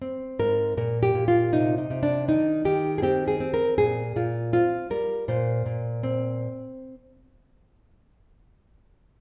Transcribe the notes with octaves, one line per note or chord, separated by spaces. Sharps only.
C4
G#2 A#4
A#2 A#4
G4
A#2
F4
C3 D#4
D#4
C3
D4
D#3 D#4
D#3 G4
G#4
C4 G4
G#4
C4
A#4
A#2 G#4
A#2 F4
C4 F4
G3 A#4
A#2 C5
A#2
C4